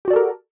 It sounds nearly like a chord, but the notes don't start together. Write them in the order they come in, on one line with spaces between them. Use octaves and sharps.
G4 F#4 D5 A4 A#4